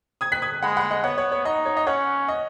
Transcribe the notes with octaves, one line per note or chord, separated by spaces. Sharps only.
D#6 G#6
F#6 B6
D#6 G#6
G#3 F#5 B5
F#5 B5
D#5
B3 C#5 F#5
C#5
C#5
D#4 D#5
C#5
D#5
C#4 C#5 F#5
D#5